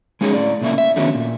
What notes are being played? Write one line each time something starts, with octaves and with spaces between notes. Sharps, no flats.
G#3 C#4 D#4 G#4 C#5
A2 D5
A#2 C#3 A3 A#3 E5
E5
D3 D#3 A3 B3 C#4 F#4
A#2